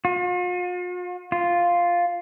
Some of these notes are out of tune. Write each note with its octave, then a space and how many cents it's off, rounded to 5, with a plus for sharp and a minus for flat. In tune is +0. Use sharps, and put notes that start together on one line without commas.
F4 +45
F4 +0